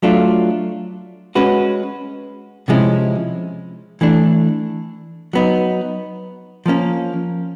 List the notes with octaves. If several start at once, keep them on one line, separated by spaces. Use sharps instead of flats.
F#3 A3 D4 F4
G#3 C#4 F#4 B4
C3 F3 G#3 C#4 E4
E3 A3 D4
F#3 B3 D#4
F3 A#3 C#4